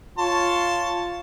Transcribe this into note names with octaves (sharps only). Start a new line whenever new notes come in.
F4 C#5 A5 C6